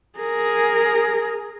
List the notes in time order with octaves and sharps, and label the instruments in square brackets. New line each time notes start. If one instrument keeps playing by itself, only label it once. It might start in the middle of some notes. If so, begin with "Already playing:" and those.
[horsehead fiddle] G#4 A#4